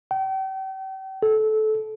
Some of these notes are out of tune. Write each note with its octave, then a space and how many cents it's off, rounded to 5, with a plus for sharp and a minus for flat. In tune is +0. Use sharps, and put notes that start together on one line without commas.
G5 -40
A4 -20